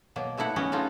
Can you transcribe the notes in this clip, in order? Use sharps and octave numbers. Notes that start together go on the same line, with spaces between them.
B2 F#3 A#3
A#2 A3 D#4 E4 F#5
F#3 B3 C#4 D#5 G5
A3 B3 D#4 F4 G#4